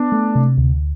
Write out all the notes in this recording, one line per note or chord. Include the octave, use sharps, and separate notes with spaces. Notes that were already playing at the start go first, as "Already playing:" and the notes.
Already playing: B3 D4
A3
C3
D2